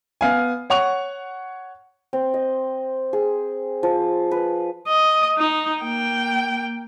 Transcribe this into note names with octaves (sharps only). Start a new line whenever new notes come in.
B3 F5 G#5
C#5 F#5 C#6 F7
C4
D#5
G#4
F3
B4
D#5
D#4
A#3 G5